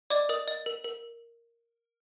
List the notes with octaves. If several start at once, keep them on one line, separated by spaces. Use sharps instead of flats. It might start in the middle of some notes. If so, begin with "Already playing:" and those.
D5 D#5 D6
A#4 D#5 D#6
D#5
A#4
A#4